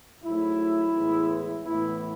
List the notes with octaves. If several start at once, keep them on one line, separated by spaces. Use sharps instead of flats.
G#2 F#3 A3 E4
A2 E3 G#3 B3
A2 E3 B3 E4